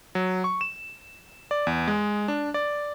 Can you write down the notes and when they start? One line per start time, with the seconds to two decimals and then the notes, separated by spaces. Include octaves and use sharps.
0.15 F#3
0.44 C#6
0.61 E7
1.51 D5
1.67 E2
1.88 G#3
2.28 D4
2.54 D5